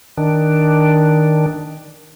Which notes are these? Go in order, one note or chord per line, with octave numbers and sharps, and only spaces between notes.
D#3 D4